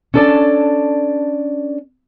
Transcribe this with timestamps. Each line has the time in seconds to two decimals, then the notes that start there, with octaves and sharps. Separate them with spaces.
0.14 C#4 D4 A4 C5 D5 A5